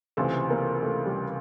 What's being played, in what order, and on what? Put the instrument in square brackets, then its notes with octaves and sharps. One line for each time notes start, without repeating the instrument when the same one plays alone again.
[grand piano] C#2 C3 E3 [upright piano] A3 A4
[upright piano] A#3 A#4
A3 A4
G3 G4